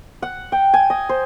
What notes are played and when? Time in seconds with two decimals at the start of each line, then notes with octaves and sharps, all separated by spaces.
0.22 F#5
0.52 G5
0.74 G#5
0.90 D#5
1.09 C5